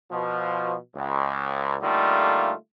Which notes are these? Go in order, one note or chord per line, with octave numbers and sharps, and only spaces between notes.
B2 F3
C#2
D3 G3 A3 A#3 D#4 F4